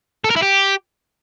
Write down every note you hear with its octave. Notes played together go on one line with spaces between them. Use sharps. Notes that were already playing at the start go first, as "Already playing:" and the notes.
A4
A#4
E4
G4